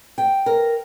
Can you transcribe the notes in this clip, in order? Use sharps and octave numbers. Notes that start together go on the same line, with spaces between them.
G5
A#4